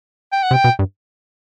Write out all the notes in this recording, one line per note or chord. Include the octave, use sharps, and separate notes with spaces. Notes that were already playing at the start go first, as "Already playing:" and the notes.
G5
F#5
C3
G5
B2
G2